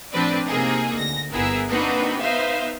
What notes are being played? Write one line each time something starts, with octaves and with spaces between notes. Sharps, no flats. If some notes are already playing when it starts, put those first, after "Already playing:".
A2 F3 C4 D4 B4 D5
C3 A#3 C4 D#4 G#4
D2 A#6
G1 B3 E4 G#4 A#4 E6
A#3 C4 D4 D#4 F#4 B4
B3 D#4 B4 C5 E5 F5